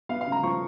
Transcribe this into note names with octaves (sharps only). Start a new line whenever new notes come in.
B3 F5
F5
C#3
A#5
F3 C#6